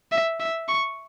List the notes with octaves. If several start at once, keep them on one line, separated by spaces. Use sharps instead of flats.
E5
E5
C#6